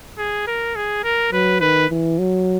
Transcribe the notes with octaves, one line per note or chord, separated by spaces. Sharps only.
G#4
A#4
G#4
A#4
F#3 B4
D#3 B4
E3
F#3